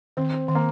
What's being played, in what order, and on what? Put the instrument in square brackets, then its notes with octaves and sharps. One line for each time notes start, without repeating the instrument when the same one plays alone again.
[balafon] D#3 [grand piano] C4
[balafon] D#3
[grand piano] A#3